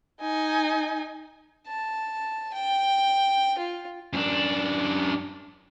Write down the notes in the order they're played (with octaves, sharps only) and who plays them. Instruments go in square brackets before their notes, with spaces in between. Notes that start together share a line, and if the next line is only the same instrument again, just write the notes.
[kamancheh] D#4 G#5
[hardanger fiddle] A5
G5
F4
[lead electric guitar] F#2 D4